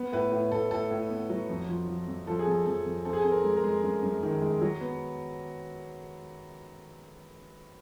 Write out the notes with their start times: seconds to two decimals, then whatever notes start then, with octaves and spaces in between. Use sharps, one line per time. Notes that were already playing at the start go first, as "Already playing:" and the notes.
Already playing: B3
0.13 A2 B4
0.32 A2
0.52 A2 A4
0.71 A2 A4
0.91 A2
1.10 B3
1.30 F#3
1.50 F2
1.69 F3
1.88 F3
2.08 F2
2.27 F3 A4
2.39 G#4
2.47 F2 A4
2.66 F2 A4
2.86 F2
3.05 C4 A4
3.13 G#4
3.21 A4
3.25 C4
3.32 A#4
3.44 G#3
3.57 A#4
3.64 G#3
3.83 F#2
4.03 F#2
4.23 D#3
4.42 G#3
4.61 F#3
4.81 B3